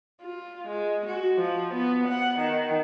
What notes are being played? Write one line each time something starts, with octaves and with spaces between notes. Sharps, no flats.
F4
G#3
F#4
F3
B3
F#5
D#3